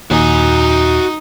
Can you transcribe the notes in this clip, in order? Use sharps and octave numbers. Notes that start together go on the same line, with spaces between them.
D#2 A#2 D#4 F#4 G#5